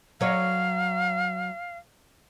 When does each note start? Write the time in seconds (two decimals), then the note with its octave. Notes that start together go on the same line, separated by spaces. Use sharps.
0.21 F#3 C#5 F5